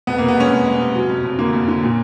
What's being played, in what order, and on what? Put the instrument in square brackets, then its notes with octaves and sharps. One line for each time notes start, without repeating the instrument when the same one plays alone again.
[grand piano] F2 [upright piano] B3
[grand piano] C3 [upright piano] A#3
[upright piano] B3
[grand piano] G#3 [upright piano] C#4
[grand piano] F2
G#3
C3
F#3
F2
F2
[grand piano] D3 [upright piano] A#3
[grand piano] F2
D3
A#2